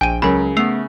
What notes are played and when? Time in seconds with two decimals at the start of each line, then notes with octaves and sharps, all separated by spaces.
0.01 A#1 G5 G#5 D#7
0.22 C#2 C#3 F#3 A#4 B5
0.57 A3 B3 E6 C7 F7